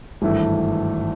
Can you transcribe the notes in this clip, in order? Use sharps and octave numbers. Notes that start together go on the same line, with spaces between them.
G#1 G2 E3 A3